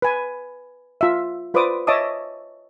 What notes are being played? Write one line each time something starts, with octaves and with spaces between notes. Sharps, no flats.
B4 G#5
F4 E5
F4 B4 C5 D5 D6 D#6
C#5 D#5 E5 A5 D6 D#6